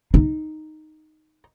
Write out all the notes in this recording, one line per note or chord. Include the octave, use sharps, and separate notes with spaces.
D#4